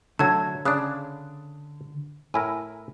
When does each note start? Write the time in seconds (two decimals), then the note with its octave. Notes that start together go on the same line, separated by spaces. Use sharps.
0.19 D3 F#3 A3 A5 G#6
0.65 C#3 D4 D#6 F#6
2.34 A2 E4 A#4 G#5